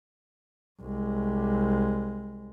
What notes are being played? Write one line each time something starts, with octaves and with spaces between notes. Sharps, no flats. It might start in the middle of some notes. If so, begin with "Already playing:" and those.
C2 G#3